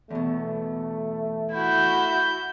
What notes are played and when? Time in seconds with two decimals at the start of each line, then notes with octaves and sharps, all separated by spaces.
0.11 E2 B2 A3
1.52 E4 F#4 G6